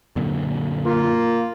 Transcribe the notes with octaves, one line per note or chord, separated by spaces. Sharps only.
F#2 A#2 D3
A#3 F4